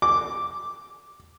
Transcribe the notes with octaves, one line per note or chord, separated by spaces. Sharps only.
D6